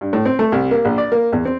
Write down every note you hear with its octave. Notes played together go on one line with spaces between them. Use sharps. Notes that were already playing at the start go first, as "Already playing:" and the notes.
G2
A2
C4
A3
C2
A#3
A#1
D5
A#3
E2
C4